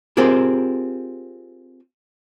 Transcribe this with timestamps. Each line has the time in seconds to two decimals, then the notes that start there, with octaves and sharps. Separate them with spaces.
0.17 C4 F4 G4 G#4 A#4